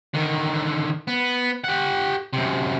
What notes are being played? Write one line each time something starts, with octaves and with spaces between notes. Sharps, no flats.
D3 D#3
B3
G4 F#5
F#2 C3